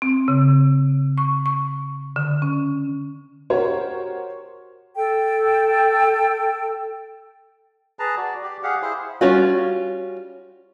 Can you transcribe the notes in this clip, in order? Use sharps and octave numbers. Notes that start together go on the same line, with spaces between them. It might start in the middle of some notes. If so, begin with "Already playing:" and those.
C4
C#3
C#6
C#6
D3
C#4
F#4 G4 A#4 C5 C#5
A4 G5
G#4 B4 A5 A#5
F#4 D5
G4 D5
G4 G#4 F5 F#5
E4 G#4 C5
G3 C#4 F4 F#4